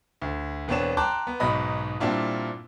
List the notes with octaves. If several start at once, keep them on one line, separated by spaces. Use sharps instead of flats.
D2
E1 B3 C4 D4 C#5 E7
G5 A5 A#5 C6 D6 F#6
B3
B1 G#2 B2 D#4 D#5 B5
G2 A#2 C4 D4 E4 F4